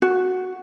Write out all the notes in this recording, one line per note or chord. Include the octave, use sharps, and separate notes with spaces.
F#4